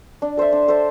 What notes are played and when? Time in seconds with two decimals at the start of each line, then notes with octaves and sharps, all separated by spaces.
0.22 D4
0.37 A4 C5 E5
0.53 D4
0.68 A4 C5 E5